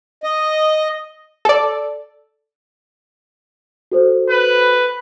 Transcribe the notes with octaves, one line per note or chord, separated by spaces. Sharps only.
D#5
A4 D5
F#4 A4 C5
B4